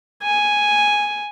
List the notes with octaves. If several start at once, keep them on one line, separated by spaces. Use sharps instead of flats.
G#5